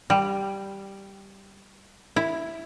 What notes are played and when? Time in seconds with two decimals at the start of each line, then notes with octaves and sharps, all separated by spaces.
0.10 G3
2.16 E4